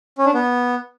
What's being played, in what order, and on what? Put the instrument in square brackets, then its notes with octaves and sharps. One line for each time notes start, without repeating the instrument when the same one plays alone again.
[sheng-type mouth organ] C#4
D4
B3